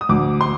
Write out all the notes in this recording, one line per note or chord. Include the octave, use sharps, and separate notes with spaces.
D#6
D2 D6
C6